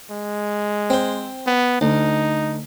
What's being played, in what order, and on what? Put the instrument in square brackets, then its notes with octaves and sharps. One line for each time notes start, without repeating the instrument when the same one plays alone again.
[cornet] G#3
[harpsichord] C4 C5
[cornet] B3
[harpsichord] D2 [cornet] D#4